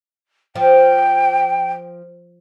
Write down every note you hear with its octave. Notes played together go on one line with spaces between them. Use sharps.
F3 G5